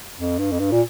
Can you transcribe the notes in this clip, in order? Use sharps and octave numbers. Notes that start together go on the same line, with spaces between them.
F2
G2
F2
G2
A#2